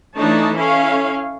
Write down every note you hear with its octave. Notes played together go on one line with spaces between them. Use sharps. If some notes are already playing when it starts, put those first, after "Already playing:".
E3 A3 D4 D#4 C#5 A5
C#4 E4 A4 C#5 F5